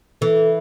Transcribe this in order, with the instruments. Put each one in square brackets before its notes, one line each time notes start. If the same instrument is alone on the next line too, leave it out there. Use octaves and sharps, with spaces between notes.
[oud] E3 [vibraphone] A4